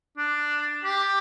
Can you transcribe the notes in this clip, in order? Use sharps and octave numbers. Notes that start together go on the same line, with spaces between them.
D4
G4